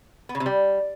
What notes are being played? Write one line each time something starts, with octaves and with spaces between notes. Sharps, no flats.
B3
C#3
C3
G3